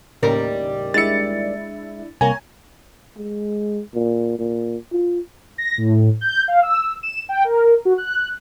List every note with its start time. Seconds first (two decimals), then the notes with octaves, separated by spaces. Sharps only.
0.23 D#2 A2 C#3 G3 A#4
0.94 G#3 D4 E4 E5 A6 C#7
2.21 C2 A#3 C#5 G#5 A#5
3.17 G#3
3.95 A#2
4.39 A#2
4.92 F4
5.58 A#6
5.78 A2
6.21 G6
6.48 F5
6.63 E6
7.03 E7
7.29 G5
7.44 A#4
7.85 F#4
7.98 F#6